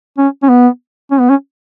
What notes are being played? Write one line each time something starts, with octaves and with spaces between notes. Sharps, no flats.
C#4
C#4
B3
C#4
B3
C#4